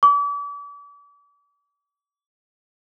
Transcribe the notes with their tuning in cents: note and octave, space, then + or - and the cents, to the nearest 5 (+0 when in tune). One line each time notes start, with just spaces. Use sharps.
D6 -40